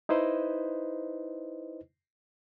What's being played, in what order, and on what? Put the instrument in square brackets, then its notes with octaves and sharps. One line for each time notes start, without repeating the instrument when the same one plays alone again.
[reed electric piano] D#4 E4 B4 C5 D#5